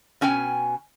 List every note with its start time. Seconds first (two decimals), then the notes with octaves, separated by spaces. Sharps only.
0.21 B2 C#4 G5 G#5